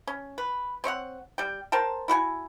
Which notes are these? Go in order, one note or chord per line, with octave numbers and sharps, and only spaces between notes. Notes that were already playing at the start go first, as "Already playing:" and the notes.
C#4
B4
C4 C#5 D#5 F#5
G3 G5
A#4 C5 G5 A5
E4 F#4 F#5 G#5